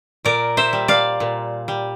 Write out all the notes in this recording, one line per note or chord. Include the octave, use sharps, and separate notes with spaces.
A#2 A#4 D5
C5 E5
G3
D5 F5
A#2
G3